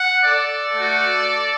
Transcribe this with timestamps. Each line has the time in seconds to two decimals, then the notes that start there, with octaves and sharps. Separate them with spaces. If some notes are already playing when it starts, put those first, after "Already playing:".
Already playing: F#5
0.24 A4 D5
0.74 A3 F#4